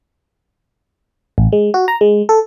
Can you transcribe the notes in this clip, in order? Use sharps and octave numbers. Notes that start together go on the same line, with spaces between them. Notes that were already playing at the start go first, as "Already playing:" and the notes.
A1
G#3
F#4
A#5
G#3
A4